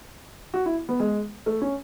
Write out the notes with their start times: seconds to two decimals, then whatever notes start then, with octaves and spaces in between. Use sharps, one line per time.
0.54 F#4
0.66 E4
0.89 B3
1.00 G#3
1.46 A3
1.62 C#4